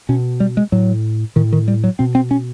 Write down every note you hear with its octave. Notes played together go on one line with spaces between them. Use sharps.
B2 C#4
G3
G#3
A2 F#3
A2 D#3
D#3
G3
F#3
B2 C4
C4
C#4